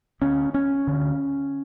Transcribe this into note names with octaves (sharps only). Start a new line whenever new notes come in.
D2 D3 C#4
C#4
D2 D3